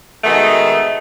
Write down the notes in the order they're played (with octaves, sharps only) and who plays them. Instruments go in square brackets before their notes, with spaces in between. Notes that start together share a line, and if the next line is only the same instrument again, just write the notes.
[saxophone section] B2 D#3 G#3 A3